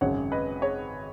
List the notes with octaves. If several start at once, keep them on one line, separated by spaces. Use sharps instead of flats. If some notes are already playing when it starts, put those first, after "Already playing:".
G#1 F#2 C#3 G#3 C#5 F#5
B4 D#5
G#4 C#5